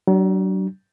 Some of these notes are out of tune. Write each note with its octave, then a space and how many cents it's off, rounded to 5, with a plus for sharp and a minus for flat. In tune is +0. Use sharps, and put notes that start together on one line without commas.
F#3 +40 D4 +0